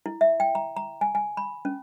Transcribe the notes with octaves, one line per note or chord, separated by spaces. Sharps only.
E4
E5
G5
A#5
A#5
G#5
G#5
B5
C#4